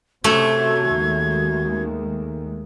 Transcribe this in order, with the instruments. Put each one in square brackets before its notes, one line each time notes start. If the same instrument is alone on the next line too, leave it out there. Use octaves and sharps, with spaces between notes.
[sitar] F#2 F#4 [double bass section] C3 [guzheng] A3 [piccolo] G#6
[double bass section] D#2 D#3 G#3